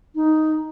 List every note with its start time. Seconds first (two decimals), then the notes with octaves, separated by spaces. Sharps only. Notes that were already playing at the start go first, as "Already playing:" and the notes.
0.15 D#4